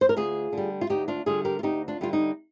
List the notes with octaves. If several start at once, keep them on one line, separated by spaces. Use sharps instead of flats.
C5
A#4
D2 F4 G#4
D3 G3
F4
D2 D#4 G4
D4 F4
D3 G3 F4 G#4
G4 A#4
F4
D2 D#4 G4
D4 F4
D3 G3 F4
D#4